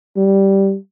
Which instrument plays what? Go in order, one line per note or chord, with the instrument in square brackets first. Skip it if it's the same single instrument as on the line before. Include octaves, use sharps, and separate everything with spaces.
[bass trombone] G3